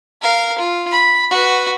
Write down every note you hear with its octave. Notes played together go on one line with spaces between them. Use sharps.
A#4 F5
F4
B5
F#4 B4